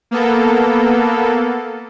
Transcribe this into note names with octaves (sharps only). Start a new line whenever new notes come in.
A#3 B3 A4